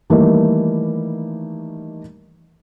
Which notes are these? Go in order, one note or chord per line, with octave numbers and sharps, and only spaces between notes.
D#3 E3 G3 A3 A#3